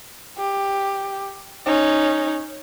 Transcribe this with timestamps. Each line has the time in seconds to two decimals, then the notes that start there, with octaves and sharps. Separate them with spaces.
0.38 G4
1.66 C#4 D#4